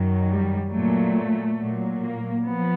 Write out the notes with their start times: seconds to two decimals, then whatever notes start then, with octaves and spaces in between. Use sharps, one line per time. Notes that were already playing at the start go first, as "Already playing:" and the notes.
Already playing: F#2 D#3 F#3
0.27 G3
0.70 A#2 F#3 A3
1.58 A#2 F#3
2.02 A#3
2.44 F3 B3